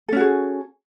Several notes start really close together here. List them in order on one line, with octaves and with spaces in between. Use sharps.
A4 C#4 F#4 G#4